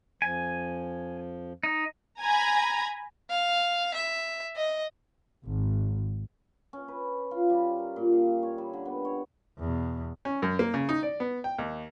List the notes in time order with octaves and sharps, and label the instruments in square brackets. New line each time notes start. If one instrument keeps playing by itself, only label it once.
[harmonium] F2 F3 [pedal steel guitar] G#5
[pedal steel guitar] D#4
[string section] G#5 A#5 B5
[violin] F5
E5
D#5
[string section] G#1
[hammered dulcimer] C#4
B4
F4
G3
A#4
A#2
F5
C#5
G3
D3
B3
C#5
[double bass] E2 B2
[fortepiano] C#4
F#2
A#3
C#3
D#4
D5
B3
G5
D#2